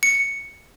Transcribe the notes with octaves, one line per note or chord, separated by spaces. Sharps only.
C#7